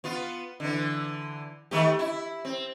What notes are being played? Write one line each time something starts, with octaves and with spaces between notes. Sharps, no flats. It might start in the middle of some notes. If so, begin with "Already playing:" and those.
B3 F4
D3 E3
D#3 A3 G4
E4
C4